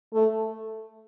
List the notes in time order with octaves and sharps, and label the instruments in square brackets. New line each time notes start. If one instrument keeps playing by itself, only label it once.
[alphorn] A3